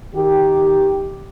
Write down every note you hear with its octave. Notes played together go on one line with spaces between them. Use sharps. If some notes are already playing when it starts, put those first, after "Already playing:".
D#3 G4